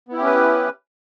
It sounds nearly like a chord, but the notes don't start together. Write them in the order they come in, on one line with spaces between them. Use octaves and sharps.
B3 E4 G4 C#4 B4